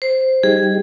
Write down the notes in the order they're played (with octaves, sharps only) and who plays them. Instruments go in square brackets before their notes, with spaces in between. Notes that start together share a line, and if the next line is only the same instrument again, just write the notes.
[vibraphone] C5
[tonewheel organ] G3 D#4 G4 [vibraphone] G#4